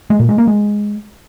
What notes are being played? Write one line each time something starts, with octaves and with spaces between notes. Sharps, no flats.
G#3
A#2
G#3
A#3
G#3